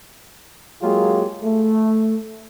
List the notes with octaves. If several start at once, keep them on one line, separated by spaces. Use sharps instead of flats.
F#3 G#3 A#3 F4 G4 G#4
A3